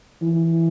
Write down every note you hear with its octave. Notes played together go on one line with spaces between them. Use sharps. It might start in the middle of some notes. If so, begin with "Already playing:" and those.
E3